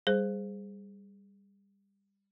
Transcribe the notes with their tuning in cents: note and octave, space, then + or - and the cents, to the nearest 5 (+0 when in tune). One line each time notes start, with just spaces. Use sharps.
G3 +15 G#4 +5 C5 +0